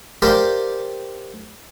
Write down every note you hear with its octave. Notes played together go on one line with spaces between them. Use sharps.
G4 A#4 C5 D5 F5 G5